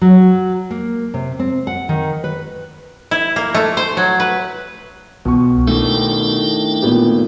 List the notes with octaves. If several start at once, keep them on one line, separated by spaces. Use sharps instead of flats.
F#3
A#3
C3
C4
F#5
D#3
B4
E4
A#3
A3
C5
F#3
B4
C2 B2 C#6
D#3 A3 D4 E4 G5
A#2 B3 G4